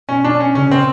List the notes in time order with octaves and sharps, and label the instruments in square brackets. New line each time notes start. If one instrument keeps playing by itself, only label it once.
[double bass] B2 [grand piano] C#4
[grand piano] D4
C#4
[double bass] C#3 [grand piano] C#4
[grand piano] C4